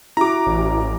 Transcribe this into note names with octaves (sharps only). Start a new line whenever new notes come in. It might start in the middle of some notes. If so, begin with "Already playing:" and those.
E4 F#4 A#5 D6
A1